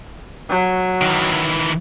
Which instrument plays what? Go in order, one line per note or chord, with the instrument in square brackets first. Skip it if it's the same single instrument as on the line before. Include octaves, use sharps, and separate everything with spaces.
[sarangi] F#3
[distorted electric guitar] D#3 E3